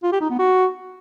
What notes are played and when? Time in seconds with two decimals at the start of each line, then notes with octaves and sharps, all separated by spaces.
0.03 F4
0.12 G4
0.21 D#4
0.30 B3
0.39 F#4